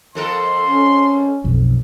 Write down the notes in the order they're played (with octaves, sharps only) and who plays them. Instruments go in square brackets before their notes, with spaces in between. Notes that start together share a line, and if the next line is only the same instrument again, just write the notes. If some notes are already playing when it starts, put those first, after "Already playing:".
[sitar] F2 A4 A#4 [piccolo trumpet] C6
[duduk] C#4
[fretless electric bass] B1 F2